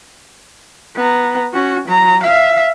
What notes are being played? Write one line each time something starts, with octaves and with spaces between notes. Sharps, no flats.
B3 A#5
C#4 F#4
F#3 A#5
E5 F5